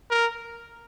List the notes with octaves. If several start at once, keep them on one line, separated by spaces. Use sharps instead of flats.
A#4